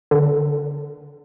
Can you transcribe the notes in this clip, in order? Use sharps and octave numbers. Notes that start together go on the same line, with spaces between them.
D3